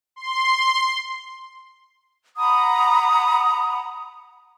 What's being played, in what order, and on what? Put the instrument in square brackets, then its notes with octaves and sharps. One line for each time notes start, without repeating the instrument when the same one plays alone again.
[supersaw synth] C6
[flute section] F#5 A#5 B5 D#6